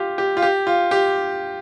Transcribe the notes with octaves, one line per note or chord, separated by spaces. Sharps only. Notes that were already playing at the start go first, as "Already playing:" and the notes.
Already playing: F4 G4
G4
F4
G4
F4
G4